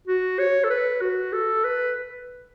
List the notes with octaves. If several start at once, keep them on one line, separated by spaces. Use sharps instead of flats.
F#4
C#5
A4
B4
F#4
A4
B4